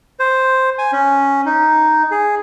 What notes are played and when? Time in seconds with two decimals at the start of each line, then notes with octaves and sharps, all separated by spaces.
0.19 C5
0.79 G#5
0.92 C#4
1.46 D#4
2.11 G#4